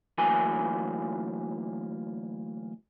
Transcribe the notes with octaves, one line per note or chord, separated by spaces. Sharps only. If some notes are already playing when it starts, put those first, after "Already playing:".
D2 E3 F#3 A#3 G#5